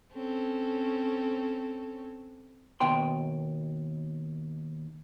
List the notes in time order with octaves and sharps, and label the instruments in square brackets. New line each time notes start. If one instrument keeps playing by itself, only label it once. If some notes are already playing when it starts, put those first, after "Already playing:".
[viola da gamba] C4 C#4 A4
[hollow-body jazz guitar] D#2 B2 G5 C6